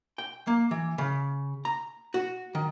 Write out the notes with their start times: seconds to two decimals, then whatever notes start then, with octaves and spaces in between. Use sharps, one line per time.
0.18 G5
0.47 A#3
0.71 E3
0.98 C#3
1.65 A#5
2.14 F#4
2.55 D#3